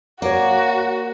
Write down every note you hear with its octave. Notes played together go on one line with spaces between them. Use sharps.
A#3 F#4 C#5 D5